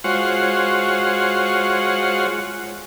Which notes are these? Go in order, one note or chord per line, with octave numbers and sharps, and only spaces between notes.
G#3 F4 F#4 C5 C#5 F#5